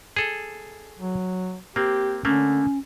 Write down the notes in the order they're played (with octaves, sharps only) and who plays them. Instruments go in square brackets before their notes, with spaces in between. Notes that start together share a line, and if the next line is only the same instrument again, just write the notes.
[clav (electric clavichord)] G#4 A4
[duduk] F#3
[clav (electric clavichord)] A#3 C4 [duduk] G4
[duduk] D3 [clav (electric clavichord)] A3 A#3 [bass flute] C#4